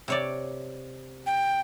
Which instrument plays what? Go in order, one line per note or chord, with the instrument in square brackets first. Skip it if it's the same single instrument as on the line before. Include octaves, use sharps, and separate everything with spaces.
[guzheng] C3 C#5 D5
[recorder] G5